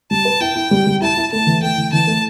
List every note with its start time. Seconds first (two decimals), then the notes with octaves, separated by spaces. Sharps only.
0.11 G3 A5
0.25 B4
0.40 E4 G5
0.56 E4
0.71 G3
0.87 G3
1.02 E4 A5
1.17 E4
1.32 A3 A5
1.47 E3
1.63 A3 G5
1.78 E3
1.93 E3 A5
2.07 A3